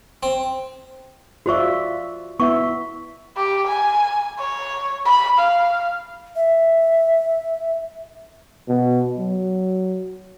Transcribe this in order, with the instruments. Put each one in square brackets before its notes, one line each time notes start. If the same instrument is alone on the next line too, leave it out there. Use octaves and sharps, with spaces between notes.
[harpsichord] C4
[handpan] F4 D5 E5 [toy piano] F#4 C5 C#6
[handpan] B3 E4 E5 [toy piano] C#6
[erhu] G4
G#5
C#5
B5
F5
[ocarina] E5
[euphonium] B2
F#3